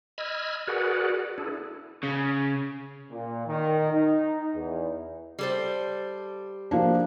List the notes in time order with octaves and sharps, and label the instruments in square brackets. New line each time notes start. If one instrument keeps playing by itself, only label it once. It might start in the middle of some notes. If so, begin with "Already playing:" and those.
[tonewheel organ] D#5 B5 E6 F6 G#6
F#4 G#4 A#4 B4 D5 F#5
D4 E4 G#4 A4
[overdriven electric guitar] C#3
[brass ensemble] A#2
D#3
D#4
E2
[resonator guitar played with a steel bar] G3 A4 C5
[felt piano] F3 A#3 D4